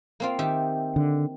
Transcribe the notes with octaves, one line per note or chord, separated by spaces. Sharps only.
A#3 C4 F4
D#3 G4 E5
D3